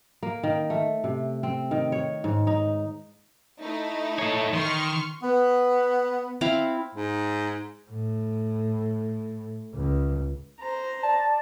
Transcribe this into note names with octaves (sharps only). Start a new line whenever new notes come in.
A#3
D#3
A3
C3
C4
D#3
C#5
G#2
D#4
A3 D#4 E4
A4 C#5
D#3 C6 C#6 F6
B3
C4 E4 F5
G#2
A2
C#2
C5 A#5
D5 A5